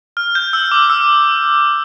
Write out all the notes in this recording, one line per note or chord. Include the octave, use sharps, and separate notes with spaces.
F6
G6
E6
D6
E6